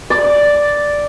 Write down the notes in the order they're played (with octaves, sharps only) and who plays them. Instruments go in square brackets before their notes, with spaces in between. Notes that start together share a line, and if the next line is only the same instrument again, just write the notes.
[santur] D5